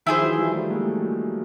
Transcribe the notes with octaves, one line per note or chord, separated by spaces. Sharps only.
D#3 F3 E4 G#4 C5
E3 F#3
F3 G3
G3 A3
G#3 A#3
G3 A3
F#3 G#3